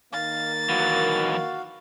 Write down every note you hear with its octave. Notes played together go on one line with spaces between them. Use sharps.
D#3 A#3 F5 A6
E3 F#3 F#4 F5